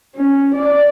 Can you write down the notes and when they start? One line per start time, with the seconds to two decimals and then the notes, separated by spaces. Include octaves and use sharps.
0.16 C#4
0.55 D5